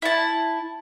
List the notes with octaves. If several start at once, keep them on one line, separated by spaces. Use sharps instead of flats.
E4 A5